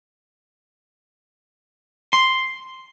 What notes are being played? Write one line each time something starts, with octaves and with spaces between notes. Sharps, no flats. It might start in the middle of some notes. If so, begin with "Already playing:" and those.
C6